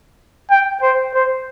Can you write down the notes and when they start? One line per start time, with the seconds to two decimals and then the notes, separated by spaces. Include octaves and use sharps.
0.50 G5
0.82 C5
1.14 C5